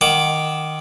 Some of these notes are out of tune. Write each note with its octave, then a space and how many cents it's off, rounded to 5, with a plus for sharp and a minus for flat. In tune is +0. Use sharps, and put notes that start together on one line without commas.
D#3 -5 F#5 +0 D6 +0